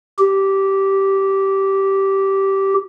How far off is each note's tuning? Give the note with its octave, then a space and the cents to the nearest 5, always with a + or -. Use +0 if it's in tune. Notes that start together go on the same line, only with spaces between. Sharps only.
G4 -15